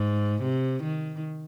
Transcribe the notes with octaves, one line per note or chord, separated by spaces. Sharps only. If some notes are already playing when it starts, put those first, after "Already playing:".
Already playing: G#2
C3
D#3